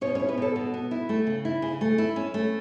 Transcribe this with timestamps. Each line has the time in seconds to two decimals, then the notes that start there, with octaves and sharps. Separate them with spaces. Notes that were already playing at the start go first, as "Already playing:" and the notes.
0.01 B2 C#4 C#5
0.15 C#4 E4 C#5
0.28 B3 B4
0.38 B2 A4
0.55 B2 F#4
0.74 B3
0.91 E4
1.09 A3
1.27 C#3
1.45 E4
1.62 C#3
1.81 A3
1.98 E4
2.16 C#4
2.34 A3